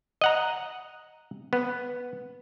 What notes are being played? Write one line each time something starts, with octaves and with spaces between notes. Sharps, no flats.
D#5 F#5 A#5
B3